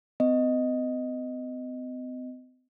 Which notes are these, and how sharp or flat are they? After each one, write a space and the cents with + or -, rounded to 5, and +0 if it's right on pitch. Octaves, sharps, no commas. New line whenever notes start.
C4 -45 D#5 +0